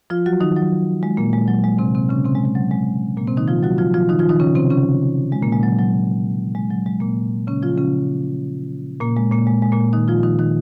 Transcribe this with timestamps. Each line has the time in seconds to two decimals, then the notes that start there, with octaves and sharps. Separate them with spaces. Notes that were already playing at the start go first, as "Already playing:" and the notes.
0.10 F3 F4
0.26 F#3 F#4
0.40 D#3 D#4
0.56 F#3
1.03 G#3
1.17 A#2 A#3
1.33 G#3
1.48 F#3
1.64 G#3
1.79 C3 C4
1.95 C3 C4
2.09 C#3 C#4
2.25 C3 C4
2.35 G#3
2.45 G#3
2.55 F#3
2.71 G#3
3.17 A#2 A#3
3.27 C3 C4
3.37 D#3 D#4
3.48 F3 F4
3.63 F#3 F#4
3.78 F3 F4
3.94 F3 F4
4.09 D#3 D#4
4.19 F3 F4
4.29 D#3 D#4
4.40 C#3 C#4
4.55 C3 C4
4.70 C#3 C#4
5.32 G#3
5.42 A#2 A#3
5.52 G#3
5.63 F#3
5.79 F#3
6.55 G#3
6.70 F#3
6.86 G#3
7.01 A#2 A#3
7.47 C#3 C#4
7.63 F3 F4
7.77 C#3 C#4
9.01 A#2 A#3
9.17 G#3
9.32 A#2 A#3
9.47 G#3
9.62 G#3
9.72 A#2 A#3
9.93 D#3 D#4
10.08 F3 F4
10.23 D#3 D#4
10.39 D#3 D#4